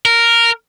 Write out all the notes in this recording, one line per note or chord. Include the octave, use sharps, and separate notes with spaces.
A#4